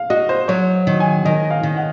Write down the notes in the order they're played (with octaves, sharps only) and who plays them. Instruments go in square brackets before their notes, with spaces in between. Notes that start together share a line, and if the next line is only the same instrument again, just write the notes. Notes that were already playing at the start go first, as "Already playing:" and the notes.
Already playing: [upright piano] F5
[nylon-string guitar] F#4 [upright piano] D#5
[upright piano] C5
[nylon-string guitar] F#3 [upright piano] C#5
[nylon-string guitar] D#3
[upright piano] G#5
[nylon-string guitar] D#3 [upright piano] D#5
[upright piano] F5
[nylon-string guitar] D#3
[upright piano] F#5